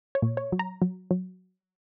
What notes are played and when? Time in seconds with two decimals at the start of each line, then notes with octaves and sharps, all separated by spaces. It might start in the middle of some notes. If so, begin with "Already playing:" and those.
0.15 C#5
0.22 A#2
0.37 C#5
0.52 F#3
0.59 A#5
0.82 F#3
1.11 F#3